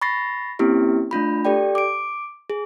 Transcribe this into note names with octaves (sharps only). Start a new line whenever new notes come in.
B5 C#6 A6 A#6 C7
A#3 C4 C#4 E4 G4
A3 D4 F4 B5
G4 A4 D5 G5
D6 D7
G#4